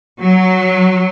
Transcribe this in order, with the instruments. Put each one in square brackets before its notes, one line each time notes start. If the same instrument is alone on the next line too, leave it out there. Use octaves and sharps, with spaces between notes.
[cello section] F#3